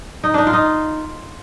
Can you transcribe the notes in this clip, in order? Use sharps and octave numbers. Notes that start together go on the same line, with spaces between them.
D#4
D4 D#4
F4
D#4